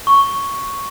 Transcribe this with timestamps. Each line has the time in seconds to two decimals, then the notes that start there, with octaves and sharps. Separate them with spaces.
0.07 C#6